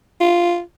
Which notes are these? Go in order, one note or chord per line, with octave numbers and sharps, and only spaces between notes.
F4